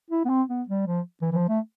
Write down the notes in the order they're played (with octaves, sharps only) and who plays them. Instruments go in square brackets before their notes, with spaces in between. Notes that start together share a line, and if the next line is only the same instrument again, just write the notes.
[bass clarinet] E4
B3
C4
B3
G3
F3
E3
E3
F3
A3